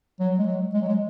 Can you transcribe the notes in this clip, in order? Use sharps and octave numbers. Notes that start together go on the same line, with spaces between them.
F#3
G#3
F#3
G#3
F#3
G#3